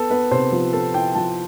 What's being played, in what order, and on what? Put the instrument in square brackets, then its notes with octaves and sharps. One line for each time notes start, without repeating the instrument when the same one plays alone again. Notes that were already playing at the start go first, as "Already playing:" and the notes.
Already playing: [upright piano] B3 [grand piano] A4
[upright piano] B3 [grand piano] B4
[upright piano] C3 [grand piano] C5
[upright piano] F3
[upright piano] B3 [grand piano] A4
[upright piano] E4 [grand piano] G5
[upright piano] F3 [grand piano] A5